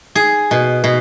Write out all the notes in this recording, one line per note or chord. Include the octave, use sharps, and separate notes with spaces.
G#4
B2
B2